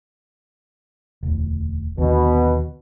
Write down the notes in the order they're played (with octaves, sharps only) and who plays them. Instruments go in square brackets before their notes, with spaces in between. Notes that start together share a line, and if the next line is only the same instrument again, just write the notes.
[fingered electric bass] E1 D2
[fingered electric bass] D#2 D3 [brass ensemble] B2